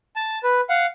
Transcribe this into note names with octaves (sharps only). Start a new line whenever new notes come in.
A5
B4
F5 F#5